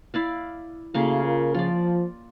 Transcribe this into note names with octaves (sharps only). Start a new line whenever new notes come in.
E4 D5 F5
C#3 A3 A#3 E4 F#4 F5
F4 A#4
F3 F4 D5